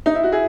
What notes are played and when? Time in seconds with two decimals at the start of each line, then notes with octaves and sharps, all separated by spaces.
0.06 D#4
0.15 E4
0.23 F#4
0.32 E4 G#4